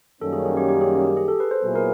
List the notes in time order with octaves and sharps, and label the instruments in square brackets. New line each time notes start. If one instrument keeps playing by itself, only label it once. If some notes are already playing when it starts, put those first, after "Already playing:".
[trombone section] F#2 D#3 G3 A#3 C#4 [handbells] A4
[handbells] G#4
G#4
G4
G4
G#4
G4
G#4
A4
B4
C5
[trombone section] A#2 F#3 B3 E4 G#4
[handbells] A#4